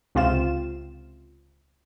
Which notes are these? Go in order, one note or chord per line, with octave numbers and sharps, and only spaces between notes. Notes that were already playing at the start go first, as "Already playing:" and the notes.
C#2 C3 C4 F4 F5 E7